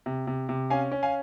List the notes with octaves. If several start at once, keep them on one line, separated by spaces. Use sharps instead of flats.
C3
C3
C3
C#4 F5 G#5
C#4
F5 G#5